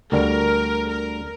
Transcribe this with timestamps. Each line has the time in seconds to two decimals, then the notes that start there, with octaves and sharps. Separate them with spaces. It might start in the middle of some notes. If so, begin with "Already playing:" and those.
0.12 D2 D3 G3 A#4
0.89 A#4